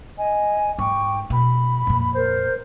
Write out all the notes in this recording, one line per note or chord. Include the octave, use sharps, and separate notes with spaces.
D#5 G#5
G#2 G5 C#6 D6
B2 B5
F2 A#2
A#4 C5